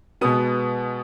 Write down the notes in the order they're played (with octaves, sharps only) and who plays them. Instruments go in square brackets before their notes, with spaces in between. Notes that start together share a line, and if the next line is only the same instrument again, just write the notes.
[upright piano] B2 G#3 B3 D#6